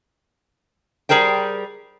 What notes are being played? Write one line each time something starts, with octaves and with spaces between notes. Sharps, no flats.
G3 G#4 A#4 C5 G5